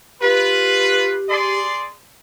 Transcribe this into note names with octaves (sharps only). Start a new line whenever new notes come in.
F4 G4 B4
G#4 D5 C6